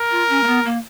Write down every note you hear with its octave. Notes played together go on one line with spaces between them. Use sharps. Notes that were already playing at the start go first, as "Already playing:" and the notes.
Already playing: A#4
F4
C#4
A#3
B3
A#3